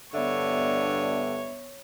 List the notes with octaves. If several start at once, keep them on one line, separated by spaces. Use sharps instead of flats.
G2 D3 B3 C#5 E5